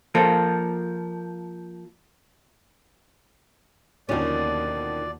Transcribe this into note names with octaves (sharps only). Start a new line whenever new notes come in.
F3 A#3 A4
D#2 B2 D3 D#3 F3 C#4 D5